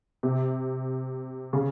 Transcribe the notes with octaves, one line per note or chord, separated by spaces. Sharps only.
C3
C#3